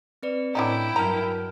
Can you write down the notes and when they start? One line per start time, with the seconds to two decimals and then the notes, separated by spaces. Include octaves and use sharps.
0.23 C4 B4 D5
0.55 A2 D3 C#4 D#4 E4 G5
0.96 G2 F#3 A#4 A5 A#5 F6